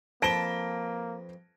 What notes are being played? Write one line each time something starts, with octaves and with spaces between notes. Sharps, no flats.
F2 A#3 B4 A5 A#6 D7 G7